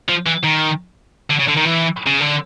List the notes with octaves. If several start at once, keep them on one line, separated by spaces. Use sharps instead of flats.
F3
E3
D#3
D3
C#3
D3
D#3
E3
C#3
D3